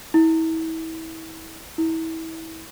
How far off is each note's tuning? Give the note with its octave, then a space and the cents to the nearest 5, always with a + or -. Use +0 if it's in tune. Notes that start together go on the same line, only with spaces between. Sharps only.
E4 -30
E4 -25